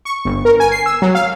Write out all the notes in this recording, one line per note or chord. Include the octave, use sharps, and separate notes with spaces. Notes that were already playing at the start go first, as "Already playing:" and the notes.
C#6
G1
A#4
G#5
C7
E6
F#3
F5